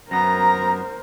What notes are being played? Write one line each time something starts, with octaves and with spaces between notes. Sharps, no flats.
F#2 B3 A#4 C5 A#5 A#6